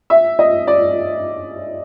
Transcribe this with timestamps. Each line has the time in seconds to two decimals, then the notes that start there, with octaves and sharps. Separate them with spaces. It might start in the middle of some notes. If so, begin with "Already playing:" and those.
0.10 E5
0.39 D#5
0.67 D5